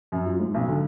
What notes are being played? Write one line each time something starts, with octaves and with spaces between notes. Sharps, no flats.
F#2
F4
G#2
B1
D3